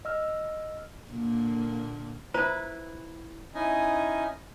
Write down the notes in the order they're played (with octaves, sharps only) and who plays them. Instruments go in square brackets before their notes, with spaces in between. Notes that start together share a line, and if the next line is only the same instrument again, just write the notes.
[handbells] D#5 E6 F6
[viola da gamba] A#2 D3 A#3
[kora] E4 B4 [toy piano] F4 C5 A#5
[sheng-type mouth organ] C#4 D#4 E4 D#5 G#5